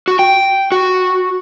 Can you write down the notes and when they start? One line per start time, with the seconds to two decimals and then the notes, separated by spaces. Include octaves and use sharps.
0.08 F#4
0.19 G5
0.72 F#4